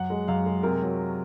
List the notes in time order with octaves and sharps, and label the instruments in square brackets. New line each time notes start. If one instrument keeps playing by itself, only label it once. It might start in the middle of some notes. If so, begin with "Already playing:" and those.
Already playing: [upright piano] F#2 F#5
G#3
F#2 F5
G#3
C3 A#4
F#3